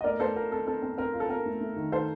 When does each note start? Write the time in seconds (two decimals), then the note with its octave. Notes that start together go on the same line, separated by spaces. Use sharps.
0.01 D#5
0.04 A3 A#4 D5
0.20 A3 A4 C5
0.36 F4 A#4
0.51 C4 A4
0.67 C4 A4
0.82 C4
0.98 C4 A#4
1.13 F4
1.20 A4
1.29 C4 A#4
1.46 A3
1.61 A3
1.76 D#3
1.92 D#3 A4 C5